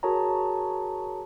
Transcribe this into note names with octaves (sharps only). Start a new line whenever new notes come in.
F#4 G#4 A#4 C#5 A5 A#5